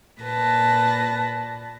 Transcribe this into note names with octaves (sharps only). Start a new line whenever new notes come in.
A#2 B4 A5 A#6